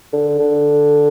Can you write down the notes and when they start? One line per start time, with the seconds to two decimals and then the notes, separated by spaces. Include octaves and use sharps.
0.13 D3
0.40 D3